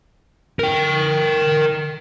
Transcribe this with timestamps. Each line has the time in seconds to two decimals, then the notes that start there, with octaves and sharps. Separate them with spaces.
0.59 A#4 G5